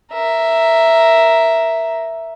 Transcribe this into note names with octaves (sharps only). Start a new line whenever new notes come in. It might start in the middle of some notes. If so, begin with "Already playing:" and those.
A#4 E5